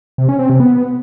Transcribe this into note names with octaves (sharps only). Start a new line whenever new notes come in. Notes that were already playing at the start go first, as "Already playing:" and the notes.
C3
C#4
C4
C3
B3